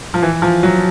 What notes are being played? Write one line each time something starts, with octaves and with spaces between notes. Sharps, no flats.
F3
E3
F3
F#3